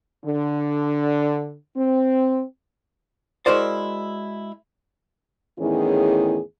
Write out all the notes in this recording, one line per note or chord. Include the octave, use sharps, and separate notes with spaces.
D3
C4
G#3 E4 F#4 A#4 C5 D5
E2 A2 D#3 C#4 E4 G#4